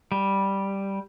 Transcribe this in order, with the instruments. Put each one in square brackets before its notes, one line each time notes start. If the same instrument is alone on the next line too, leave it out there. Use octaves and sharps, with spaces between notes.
[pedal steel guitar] G3